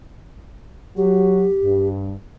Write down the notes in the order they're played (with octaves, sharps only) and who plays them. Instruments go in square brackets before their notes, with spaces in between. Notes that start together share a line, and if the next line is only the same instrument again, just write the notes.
[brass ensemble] F#3 F#4 [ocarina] G4
[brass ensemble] G2